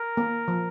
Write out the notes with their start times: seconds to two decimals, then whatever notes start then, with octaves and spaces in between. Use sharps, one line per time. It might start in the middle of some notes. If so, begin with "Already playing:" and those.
Already playing: A#4
0.17 A#3
0.48 F3